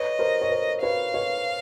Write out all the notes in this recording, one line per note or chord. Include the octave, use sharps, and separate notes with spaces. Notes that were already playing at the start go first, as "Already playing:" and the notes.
Already playing: B4 C#5 D#5
A#4 C5
C#5
A#4 C5
B4 C#5 F5
B4 C#5